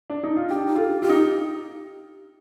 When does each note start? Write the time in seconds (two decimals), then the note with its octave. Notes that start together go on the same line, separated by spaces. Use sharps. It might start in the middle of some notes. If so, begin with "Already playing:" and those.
0.10 D4
0.23 D#4
0.37 F4
0.50 D4 G4
0.67 D#4
0.75 F4 A4
0.85 G4
1.02 F4 G4
1.09 D#4